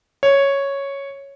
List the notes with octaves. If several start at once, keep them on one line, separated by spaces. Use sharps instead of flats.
C#5